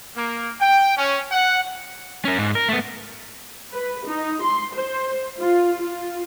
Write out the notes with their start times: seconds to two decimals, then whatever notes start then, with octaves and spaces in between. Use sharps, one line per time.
0.16 A#3
0.60 G5
0.97 C#4
1.32 F#5
2.25 C#4 A#4
2.38 G#2
2.55 A#4
2.69 A3 B3
3.72 B4
4.07 D#4
4.43 C6
4.74 C5
5.40 F4
5.81 F4